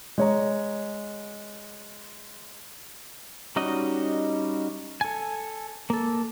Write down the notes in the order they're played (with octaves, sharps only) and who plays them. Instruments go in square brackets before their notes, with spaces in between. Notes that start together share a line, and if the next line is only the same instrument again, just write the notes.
[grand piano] G#3 C#5 A#5
[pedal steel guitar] G3 C#4 D#4 F#4 D#5
A4 G#5
A#3 A4